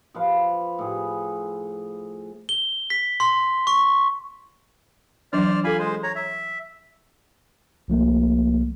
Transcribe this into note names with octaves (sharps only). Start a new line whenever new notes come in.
F3 B4 F5
A2 G#4
G7
B6
C6
C#6
E3 F#3 D4 C5 D5 F6
F4 A4 F5 G#5 B5
G#3 C5
C#5 A#5
E5
C2 F3 A3 A#3